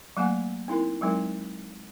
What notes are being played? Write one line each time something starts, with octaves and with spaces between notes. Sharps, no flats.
F#3 A3 A#3 F#5 G#5
C4 D#4 E4 A#4
F#3 G#3 C4 D#4 A#4